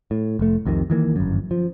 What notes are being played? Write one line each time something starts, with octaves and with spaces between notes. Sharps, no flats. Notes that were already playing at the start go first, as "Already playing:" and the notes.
A2
F1 A3
C2 F2 C3 D#3
D#3 E3 A#3
G1 F#2
F3